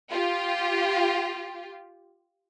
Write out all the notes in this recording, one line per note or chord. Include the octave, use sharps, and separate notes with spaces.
F4 G4